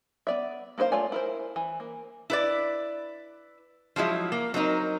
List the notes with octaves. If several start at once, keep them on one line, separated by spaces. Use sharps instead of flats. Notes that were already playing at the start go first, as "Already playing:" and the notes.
B3 D5 E5
A#3 D#4 B4 C5 F5
A3 F4 C#5 D5 G#5
E4 A#4 C5
E3
A#3
E4 B4 D5
F3 F#3 G#3 E4
A#3
F#3 C4 D#4 A#4